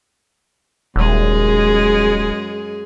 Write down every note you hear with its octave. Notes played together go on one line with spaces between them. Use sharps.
D#1 F#2 G#3 G#4